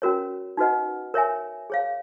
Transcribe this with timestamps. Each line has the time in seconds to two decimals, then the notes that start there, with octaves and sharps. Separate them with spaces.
0.02 C#4 F#4 A#4 C#5
0.57 D#4 F#4 B4 D#5 F#5
1.14 A#4 C#5 E5 G#5
1.70 G#4 C#5 F5